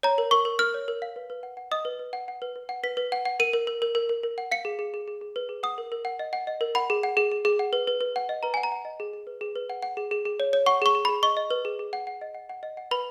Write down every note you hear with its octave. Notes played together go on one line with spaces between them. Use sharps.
C#5 A#5
A#4
A#4 C#6
A#4
A#4 F6
C#5
A#4
F5
B4
B4
F#5
F#5
D#5 D#6
B4
B4
F#5
F#5
B4
B4
F#5
B4 B6
B4
F#5
F#5
A#4 D#7
A#4
A#4
A#4
A#4
A#4
A#4
F#5
F5 C#7
G#4
G#4
G#4
G#4
G#4
B4
G#4
F#5 D#6
A#4
A#4
F#5
D#5
F#5
D#5
A#4
F#5 B5
G#4
F#5
G#4
G#4
G#4
F#5
B4
B4
B4
F#5
D#5
B4 A#5
F#5 G#5
A#5
F#5
D#5
G#4
G#4
B4
G#4
B4
F#5
F#5
G#4
G#4
G#4
C#5
C#5
F#5 C#6
G#4 C#6
G#4
G#4 B5
D#5 C#6
D#5
B4
G#4
G#4
F#5
F#5
D#5
F#5
F#5
D#5
F#5
B4 B5